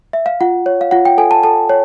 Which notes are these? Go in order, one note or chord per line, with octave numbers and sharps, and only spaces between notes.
E5
F5
F4 F#5
C#5
F5
F4 F#5
G5
A4 G#5
A5
A4 A5
C#5